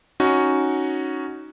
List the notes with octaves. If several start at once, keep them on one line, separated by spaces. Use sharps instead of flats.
C#4 D#4 F#4